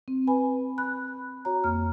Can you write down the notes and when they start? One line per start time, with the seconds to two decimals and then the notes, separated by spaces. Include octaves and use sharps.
0.08 C4
0.27 B4 G#5 B5
0.78 B5 F#6
1.45 F#4 C#5 A#5
1.64 F2 A#3 F6